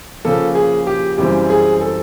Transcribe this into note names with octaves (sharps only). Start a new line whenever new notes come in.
C#3 F3 A#3 A4
G#4
G4
F#2 C#3 E3 G3 C4 G4
G#4
A4